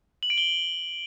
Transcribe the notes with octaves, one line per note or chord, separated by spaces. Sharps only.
F#7
D7
G7